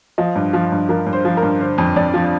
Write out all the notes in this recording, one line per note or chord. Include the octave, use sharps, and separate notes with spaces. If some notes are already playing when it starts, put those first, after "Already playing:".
F3 D#5
G2
F3
G2
F3 A#4
G2
C5
F3
A#4
G2
D3 C5
F2
F2 D5
F3